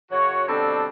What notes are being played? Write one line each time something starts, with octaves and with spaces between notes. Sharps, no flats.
F#2 C#3 F#3 F#4 C#5
B2 D3 G3 C4 D4 A4